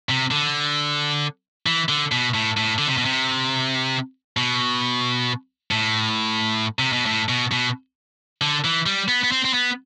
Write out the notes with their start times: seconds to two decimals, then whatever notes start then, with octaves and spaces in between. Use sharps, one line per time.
0.09 C3
0.31 D3
1.66 E3
1.89 D3
2.12 B2
2.34 A2
2.57 A2
2.78 D3
2.87 C3
2.97 B2
3.05 C3
4.37 B2
5.71 A2
6.79 C3
6.93 B2
7.06 A2
7.29 B2
7.51 B2
8.41 D3
8.64 E3
8.86 G3
9.08 B3
9.24 B3
9.32 C4
9.45 C4
9.54 B3